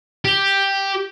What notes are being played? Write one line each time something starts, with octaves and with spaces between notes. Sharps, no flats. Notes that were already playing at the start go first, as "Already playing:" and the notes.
G4